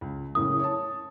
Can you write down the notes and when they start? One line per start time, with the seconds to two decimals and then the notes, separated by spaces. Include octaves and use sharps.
0.01 C#2
0.35 F#1 A2 C#3 D#6
0.59 C#5 A5